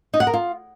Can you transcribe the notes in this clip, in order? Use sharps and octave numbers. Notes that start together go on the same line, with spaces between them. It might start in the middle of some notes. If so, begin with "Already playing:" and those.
D#4
F#5
A#4
F4